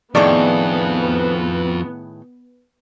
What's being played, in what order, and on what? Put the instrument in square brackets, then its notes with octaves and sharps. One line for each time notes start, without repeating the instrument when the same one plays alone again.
[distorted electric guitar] F2 [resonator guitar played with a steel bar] A2 D#3 G#4 [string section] B3 [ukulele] D5